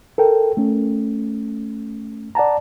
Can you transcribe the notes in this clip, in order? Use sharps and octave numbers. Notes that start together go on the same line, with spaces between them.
A4 A#4 G5
A3 C#4
D5 F#5 A5 A#5